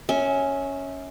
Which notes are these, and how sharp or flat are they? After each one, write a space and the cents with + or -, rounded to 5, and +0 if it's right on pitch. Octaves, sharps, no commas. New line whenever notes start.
C#4 +0 E5 -30